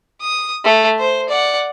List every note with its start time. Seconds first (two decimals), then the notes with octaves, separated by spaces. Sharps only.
0.22 D#6
0.64 A3
0.99 C5
1.29 D5 F#5